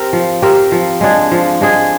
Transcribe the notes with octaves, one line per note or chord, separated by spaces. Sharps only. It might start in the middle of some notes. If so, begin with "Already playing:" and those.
Already playing: C4 G4 A#4
F3
C4 G4 A#4
F3
G#3 D4 G#4
F3
G#3 D4 G#4